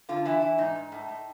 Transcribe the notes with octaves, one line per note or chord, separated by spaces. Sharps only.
D3 F4
E3 E4
E3
G#2 D#4
G#2
A2
A2